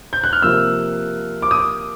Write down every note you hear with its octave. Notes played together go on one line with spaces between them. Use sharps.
G6
F#6
F6
C3 F3 A#3 E6
D6
D#6